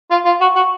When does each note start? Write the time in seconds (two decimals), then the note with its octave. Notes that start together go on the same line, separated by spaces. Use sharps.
0.11 F4
0.26 F4
0.41 F#4
0.56 F#4